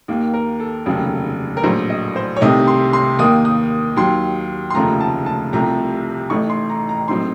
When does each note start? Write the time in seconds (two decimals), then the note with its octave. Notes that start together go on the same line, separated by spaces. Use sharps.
0.08 D#2 D#3 A#3
0.34 A#4
0.60 A4
0.86 F1 D#2 C#3 F#3
1.57 A#4
1.64 A#1 A2 F#3 C5
1.90 D#5
2.16 C5
2.36 C#5
2.41 C2 C3 D#3 A3 D#4 D#5
2.67 C6
2.93 C6
3.19 D#2 D#3 A#3 D#4 D#6
3.45 D#6
3.96 D#2 D#3 F#3 C6
4.70 C6
4.74 F1 D#2 C#3 F3 A3 A#5
5.01 A5
5.26 A5
5.53 C2 C3 F3 A3 A#5
6.30 A1 A2 A3 D#4 C#6
6.50 C6
6.70 A#5
6.89 A#5
7.08 A#1 A2 F#3 C4 D#4 C6